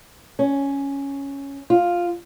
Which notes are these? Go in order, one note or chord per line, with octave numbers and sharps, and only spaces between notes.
C#4
F4